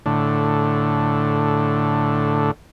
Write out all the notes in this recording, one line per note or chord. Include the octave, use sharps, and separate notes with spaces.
A2 D3